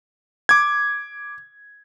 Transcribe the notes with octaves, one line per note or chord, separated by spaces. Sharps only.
D6 G#6